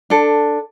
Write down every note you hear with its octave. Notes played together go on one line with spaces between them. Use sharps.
D4 A4